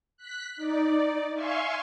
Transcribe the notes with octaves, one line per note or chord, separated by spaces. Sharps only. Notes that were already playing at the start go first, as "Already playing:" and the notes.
F#6 B6
D#4 D5
E5 F5 G#5 C6 C#6